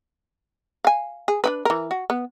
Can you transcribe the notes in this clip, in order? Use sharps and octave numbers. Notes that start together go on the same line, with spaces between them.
F5 G#5
G#4
D4 E4 B4
E3 A#4
F#4
B3